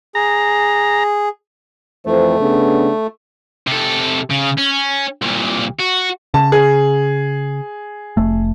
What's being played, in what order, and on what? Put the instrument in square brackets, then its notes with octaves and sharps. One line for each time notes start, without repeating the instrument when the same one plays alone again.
[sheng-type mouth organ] G#4 [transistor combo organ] A#5
[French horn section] F2 E3 C5 [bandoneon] A3
[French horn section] C#3 B3 D4
[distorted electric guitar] C3 A4
C#3
C#4
C2 A#2
F#4
[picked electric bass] C#3 [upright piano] A5
[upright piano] G#4
[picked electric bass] F1 A3